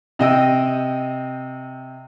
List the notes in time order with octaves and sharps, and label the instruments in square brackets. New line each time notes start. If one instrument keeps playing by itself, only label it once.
[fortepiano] C3 D#5 G5 E6